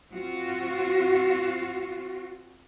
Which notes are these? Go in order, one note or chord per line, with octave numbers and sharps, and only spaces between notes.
C4 F4 F#4